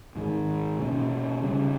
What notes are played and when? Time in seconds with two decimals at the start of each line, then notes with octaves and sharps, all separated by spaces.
0.16 G#2 D#3 G#3
0.79 B2 A#3 C#4
1.42 C#3 G3 C#4